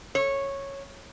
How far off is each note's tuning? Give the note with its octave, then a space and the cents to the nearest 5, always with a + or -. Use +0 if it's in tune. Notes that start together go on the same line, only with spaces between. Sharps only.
C#5 -10